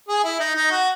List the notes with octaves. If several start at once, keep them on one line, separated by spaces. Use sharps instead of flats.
G#4
E4
D#4
D#4
F#4